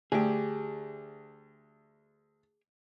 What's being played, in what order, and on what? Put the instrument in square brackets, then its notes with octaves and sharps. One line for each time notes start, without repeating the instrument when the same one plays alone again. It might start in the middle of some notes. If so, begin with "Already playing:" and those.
[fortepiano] D2 [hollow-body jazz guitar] G4 G#4